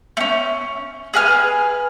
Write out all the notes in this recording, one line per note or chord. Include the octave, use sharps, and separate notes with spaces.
A3 C#4
G#4 B4 G#5 F6